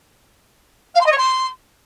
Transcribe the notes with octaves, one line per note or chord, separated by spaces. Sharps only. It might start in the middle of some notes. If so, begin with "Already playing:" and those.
F5
C6
D#5
C#5
C6